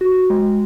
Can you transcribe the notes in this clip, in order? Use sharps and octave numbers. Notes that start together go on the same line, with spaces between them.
F#4
G#3